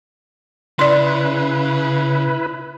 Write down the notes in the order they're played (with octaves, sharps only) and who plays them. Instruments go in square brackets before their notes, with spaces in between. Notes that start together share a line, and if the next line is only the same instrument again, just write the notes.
[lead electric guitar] C#3 [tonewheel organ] E4 B4 [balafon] D5 C6